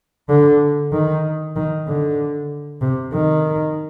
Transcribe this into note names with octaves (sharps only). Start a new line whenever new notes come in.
D3
D#3
D#3
D3
C3
D#3